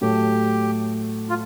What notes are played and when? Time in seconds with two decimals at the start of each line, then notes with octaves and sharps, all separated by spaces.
0.01 A2 F#3 A3 G4
1.29 F4